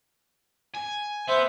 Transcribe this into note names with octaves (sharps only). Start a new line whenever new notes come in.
G#5
B3 C5 E5